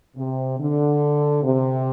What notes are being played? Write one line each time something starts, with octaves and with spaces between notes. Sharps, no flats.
C3
D3
C3